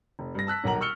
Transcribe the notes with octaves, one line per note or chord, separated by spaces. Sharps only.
F1
G2 A#6
A5 E6 F#6 B6
D#1 B1 A#4 F#5 A#5 F#7
C#6 E6 F6 C#7 G7